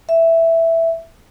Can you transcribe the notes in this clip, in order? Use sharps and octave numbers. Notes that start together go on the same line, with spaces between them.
E5